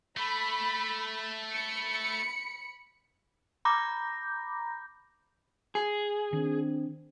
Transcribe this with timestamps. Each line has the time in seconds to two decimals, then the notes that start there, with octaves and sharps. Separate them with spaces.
0.17 A3 B5
1.54 B5 C#7
3.65 A#5 B5 D6 G6 A#6
5.75 G#4
6.33 D#3 C4 D4